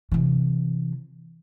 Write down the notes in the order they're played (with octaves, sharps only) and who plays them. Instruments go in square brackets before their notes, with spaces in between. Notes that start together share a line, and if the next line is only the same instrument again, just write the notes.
[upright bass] C3 E3